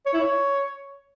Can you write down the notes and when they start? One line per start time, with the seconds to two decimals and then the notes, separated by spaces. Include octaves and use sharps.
0.06 C#5
0.13 E4
0.21 C#5